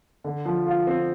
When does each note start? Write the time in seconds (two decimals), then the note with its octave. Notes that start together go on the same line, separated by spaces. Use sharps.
0.24 D3
0.45 F3
0.67 F4
0.87 C4